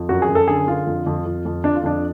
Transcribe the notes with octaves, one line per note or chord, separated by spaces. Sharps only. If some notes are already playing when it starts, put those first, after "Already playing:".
Already playing: F2
F#2 F#4
G#4
F#2
A4
D3 G#4
D3 F4
F2
F2
F2
F2
F2 D4
F4
F2 D4